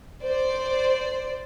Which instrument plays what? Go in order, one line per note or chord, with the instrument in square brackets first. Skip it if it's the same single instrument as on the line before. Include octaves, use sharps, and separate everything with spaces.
[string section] C5 D5